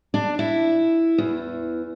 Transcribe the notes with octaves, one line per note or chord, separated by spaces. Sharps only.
D4
E4
E2